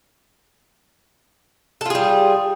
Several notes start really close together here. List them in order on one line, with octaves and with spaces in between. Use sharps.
A4 F4 G#4 G3